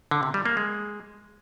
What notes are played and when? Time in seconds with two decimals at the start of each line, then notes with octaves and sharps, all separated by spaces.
0.11 D3
0.23 C3
0.34 G3
0.46 A#3
0.57 G#3